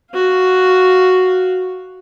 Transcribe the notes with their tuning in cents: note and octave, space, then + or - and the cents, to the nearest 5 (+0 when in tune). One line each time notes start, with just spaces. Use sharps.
F#4 +0 F5 +0